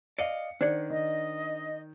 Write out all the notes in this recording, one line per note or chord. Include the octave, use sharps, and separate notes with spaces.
D5 D#5 F5 C#7
D#3 D4 C5 D5 F#5
D#3 D#5